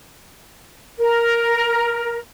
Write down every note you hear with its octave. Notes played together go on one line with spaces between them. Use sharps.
A#4